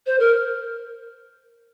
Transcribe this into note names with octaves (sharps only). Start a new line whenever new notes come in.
C5
A#4